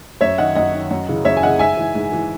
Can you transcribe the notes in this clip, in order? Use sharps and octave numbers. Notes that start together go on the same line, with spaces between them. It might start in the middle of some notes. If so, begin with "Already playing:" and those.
F#2 C#5 E5
D#3 D#5 F#5
F#2 D#5 F#5
D#3
F#2
C#3 E3
F#2 C#5 E5
G#5
C#3 E3 D#5 F#5
G#2 E5 G#5
E3
G#2
E3